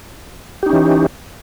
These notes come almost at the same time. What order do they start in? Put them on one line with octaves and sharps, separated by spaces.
G4 D#4 C#4 E3